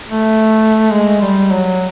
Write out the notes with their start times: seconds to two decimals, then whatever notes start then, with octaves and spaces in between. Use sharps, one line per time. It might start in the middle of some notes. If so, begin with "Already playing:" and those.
0.11 A3
0.92 G#3
1.22 G3
1.52 F#3